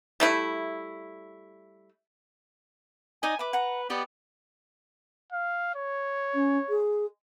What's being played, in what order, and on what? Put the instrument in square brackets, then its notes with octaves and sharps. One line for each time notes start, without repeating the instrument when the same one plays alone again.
[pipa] G3 A3 E4
[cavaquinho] D#4 D5 D#5 [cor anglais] G#5
[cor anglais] B4 [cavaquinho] E5 D6
[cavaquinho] F#5 A#5
[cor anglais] B3 [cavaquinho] G4 D5 D#5
[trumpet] F5
C#5
[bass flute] C#4
G#4